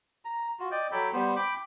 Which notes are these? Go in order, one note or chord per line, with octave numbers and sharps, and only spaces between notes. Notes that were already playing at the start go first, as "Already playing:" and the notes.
A#5
F4 F#4
D5 D#5 G5
F#3 A4 G5 B5
G3 B3 C5
G5 B5 D6